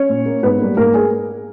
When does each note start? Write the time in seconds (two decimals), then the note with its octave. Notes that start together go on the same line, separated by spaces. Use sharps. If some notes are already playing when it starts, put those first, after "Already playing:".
Already playing: C#4 C#5
0.09 A#2
0.25 A#3
0.43 G#2 B3 B4
0.60 G3 A#3
0.77 G#2 A#3 A#4
0.94 G#4